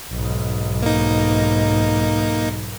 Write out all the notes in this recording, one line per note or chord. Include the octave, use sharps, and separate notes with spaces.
B1 G#2
A#3 D#4